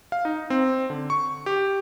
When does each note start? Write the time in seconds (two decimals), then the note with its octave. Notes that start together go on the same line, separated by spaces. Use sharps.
0.12 F5
0.25 D#4
0.50 C4
0.90 D3
1.10 C#6
1.46 G4